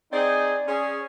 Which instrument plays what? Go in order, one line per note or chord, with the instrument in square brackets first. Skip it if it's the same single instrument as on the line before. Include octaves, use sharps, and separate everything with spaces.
[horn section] C4 D#4 G#4 [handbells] D5 G#5
[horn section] C#4 G#4